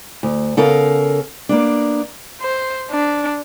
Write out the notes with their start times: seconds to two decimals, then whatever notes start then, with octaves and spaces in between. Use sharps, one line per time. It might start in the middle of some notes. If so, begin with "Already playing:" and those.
0.23 D2
0.57 C#3 B3 A4 A#4 F5
1.49 A#3 B3 D4
2.41 C5
2.91 D4